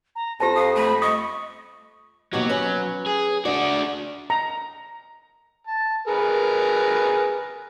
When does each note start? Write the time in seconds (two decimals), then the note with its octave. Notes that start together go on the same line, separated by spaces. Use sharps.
0.15 A#5
0.40 F2 F4 G4 C5 A5 A#6
0.55 F5 D#6
0.76 A3 B5
1.02 D#5 C#6 D#6
2.33 D#2 B2 F#3 G4
2.49 C#4 B4
3.06 G#4
3.45 D4 F#4 D5
4.30 A#5
5.67 A5
6.07 G#4 A#4 B4